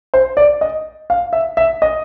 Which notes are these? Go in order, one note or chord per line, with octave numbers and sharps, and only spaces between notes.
C5
D5
D#5
F5
E5
E5
D#5